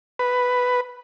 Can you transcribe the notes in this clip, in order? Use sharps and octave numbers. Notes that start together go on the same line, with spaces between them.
B4